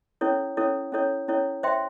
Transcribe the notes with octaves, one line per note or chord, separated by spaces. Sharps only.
C#4 E4 A4 C#5
C#4 E4 A4 C#5
C#4 E4 A4 C#5
C#4 E4 A4 C#5
C5 E5 G5 C6